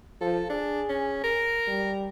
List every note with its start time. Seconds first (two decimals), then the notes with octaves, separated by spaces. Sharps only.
0.21 F3 A4
0.50 D4 G#4
0.89 C#4
1.24 A#4
1.68 G3